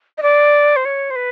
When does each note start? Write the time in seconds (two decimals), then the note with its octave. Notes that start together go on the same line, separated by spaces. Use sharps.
0.18 D#5
0.22 D5
0.76 C5
0.85 C#5
1.10 C5
1.16 B4